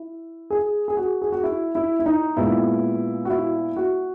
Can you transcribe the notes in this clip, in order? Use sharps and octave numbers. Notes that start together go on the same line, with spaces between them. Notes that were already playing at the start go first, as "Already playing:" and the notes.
Already playing: E4
G#4
G#4
F#4
G#4
F#4
E4
E4
E4
D#4
A#2 G#3 B3 E4
F#4
E4
F#4